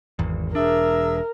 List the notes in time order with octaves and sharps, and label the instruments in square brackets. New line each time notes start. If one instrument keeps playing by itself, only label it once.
[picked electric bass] G#1 E2
[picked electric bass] E1 D4 [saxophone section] G#4 E5 [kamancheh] A#4